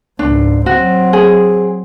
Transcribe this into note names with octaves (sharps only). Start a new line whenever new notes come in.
C#2 G#2 D4
F#3 C4 F#4
G#4